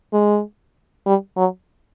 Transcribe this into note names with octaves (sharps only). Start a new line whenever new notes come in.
G#3
G3
F#3